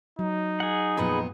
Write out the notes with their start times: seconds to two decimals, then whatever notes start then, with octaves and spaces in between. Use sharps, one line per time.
0.19 F#3 D#4
0.60 G#4 F#5
0.97 F2 A#2 B3 G#4 B4 F#5